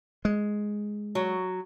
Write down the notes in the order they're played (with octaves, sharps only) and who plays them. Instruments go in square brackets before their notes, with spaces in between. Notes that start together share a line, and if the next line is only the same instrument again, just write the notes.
[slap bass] G#3
[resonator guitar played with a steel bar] F#3